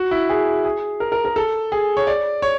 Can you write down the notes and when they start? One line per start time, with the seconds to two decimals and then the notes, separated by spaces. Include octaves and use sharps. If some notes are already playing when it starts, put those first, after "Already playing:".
Already playing: F#4
0.11 E4
0.29 G#4
0.65 G#4
1.00 A#4
1.12 A#4
1.25 A#4
1.36 A4
1.72 G#4
1.97 C#5
2.07 D5
2.42 C#5